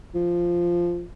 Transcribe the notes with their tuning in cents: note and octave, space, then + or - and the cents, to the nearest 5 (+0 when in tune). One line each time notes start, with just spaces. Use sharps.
F3 -5